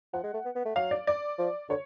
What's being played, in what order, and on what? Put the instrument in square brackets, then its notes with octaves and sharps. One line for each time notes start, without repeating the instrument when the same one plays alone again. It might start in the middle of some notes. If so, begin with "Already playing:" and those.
[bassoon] F3 [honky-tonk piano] F#5
[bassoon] G#3
A3
B3
B3
A3
[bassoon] F#3 [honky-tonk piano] F5
[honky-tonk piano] D5
D5
[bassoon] F3
[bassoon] D3 [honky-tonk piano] C#5